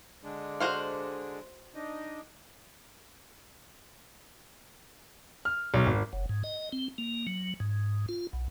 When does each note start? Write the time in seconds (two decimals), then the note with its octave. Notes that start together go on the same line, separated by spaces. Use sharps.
0.23 D3 G#3 D4
0.60 F#4 C5 F5
1.75 D4 D#4 D#5
5.45 F6
5.74 B1
5.86 G#1
6.13 F#1
6.29 G#2
6.44 D#5
6.72 C4
6.98 A#3
7.27 F#3
7.60 G#2
8.09 F4
8.33 B1